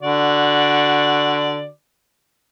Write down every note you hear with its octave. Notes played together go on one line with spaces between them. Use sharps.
D3 F#4 D5